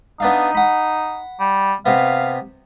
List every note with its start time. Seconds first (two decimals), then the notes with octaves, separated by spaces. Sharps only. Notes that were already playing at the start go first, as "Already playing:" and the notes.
0.20 B3 D4 D#4 F5
0.55 F#5 B5
1.40 G3
1.86 C3 B3 F5